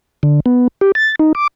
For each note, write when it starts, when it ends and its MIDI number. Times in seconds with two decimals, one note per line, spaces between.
0.23 0.40 50
0.46 0.68 59
0.81 0.92 67
0.95 1.15 93
1.19 1.33 63
1.35 1.47 86